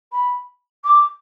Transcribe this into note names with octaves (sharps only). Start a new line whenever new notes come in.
B5
D6